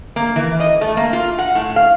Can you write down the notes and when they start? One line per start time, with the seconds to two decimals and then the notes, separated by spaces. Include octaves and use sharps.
0.16 A#3
0.36 E3
0.60 D#5
0.81 A3
0.97 A#3
1.13 F4
1.39 F#5
1.55 A2
1.76 F5